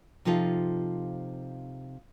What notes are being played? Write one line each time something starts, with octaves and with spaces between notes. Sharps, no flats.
C3 F3 D#4 F4 A4